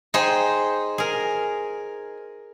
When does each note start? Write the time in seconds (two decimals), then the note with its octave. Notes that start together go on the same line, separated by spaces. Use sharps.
0.14 D#4 G#4 C5 G5
0.98 G#4 A#4